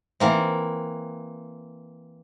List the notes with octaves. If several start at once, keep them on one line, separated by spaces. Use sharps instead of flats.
E3 A#3 C4